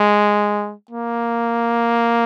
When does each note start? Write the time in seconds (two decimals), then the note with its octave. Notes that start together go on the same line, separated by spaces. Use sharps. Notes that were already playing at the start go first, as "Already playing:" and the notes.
Already playing: G#3
0.91 A#3